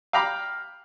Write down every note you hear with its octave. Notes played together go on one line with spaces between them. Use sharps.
F5 G5 A#5 B5 D6 F6